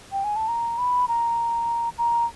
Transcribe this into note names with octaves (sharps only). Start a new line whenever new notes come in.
G5
G#5
A5
A#5
B5
A#5
A#5